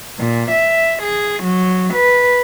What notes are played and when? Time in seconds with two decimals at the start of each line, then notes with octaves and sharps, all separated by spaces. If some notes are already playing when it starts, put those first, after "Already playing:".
0.19 A#2
0.51 E5
1.03 G#4
1.44 F#3
1.94 B4